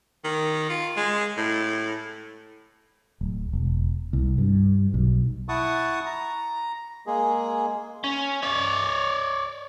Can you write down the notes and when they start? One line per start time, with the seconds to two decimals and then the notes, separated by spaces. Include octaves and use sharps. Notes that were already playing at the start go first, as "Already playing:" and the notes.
0.24 D#3
0.69 F4
0.97 G#3
1.37 A2
3.21 D1
3.53 E1
4.13 C2
4.38 G2
4.94 B1
5.49 E4 F#5 A5 C#6 D#6
6.06 A#5
7.06 G#3 A#3 G#4
8.04 C#4
8.42 C#5 D5